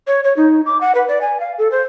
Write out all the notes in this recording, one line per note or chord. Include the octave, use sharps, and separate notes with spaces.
C#5
C#5
D#4
D6
F#5
B4
D5
G#5
F5
A4
C5